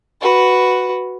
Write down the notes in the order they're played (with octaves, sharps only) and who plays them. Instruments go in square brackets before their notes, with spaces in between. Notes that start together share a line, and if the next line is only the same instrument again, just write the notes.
[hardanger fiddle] F#4 B4